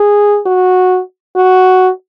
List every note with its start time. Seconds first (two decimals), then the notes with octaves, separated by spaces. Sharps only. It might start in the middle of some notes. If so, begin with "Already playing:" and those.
Already playing: G#4
0.46 F#4
1.36 F#4